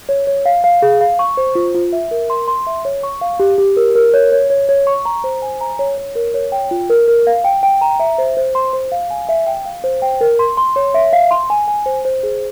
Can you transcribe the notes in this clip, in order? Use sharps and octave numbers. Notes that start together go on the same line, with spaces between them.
C#5
C#5
F5
F5
G#4
F5
C#6
C5
F4
F4
E5
A#4
C6
C6
E5
C#5
C#6
F5
G4
G4
A#4
A#4
C#5
C#5
C#5
C#5
C#6
A#5
C5
G#5
A#5
C#5
C#5
A#4
C#5
G5
F4
A#4
A#4
F5
G5
G5
A#5
E5
C5
C5
C6
C5
F5
G#5
E5
G5
F5
C5
G5
A#4
C6
C6
C#5
E5
F5
C6
G#5
G#5
C5
C5
G#4